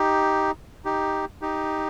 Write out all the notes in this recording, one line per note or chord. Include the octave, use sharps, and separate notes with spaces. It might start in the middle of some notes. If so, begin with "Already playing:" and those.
Already playing: D#4 G4
D#4 G4
D#4 G4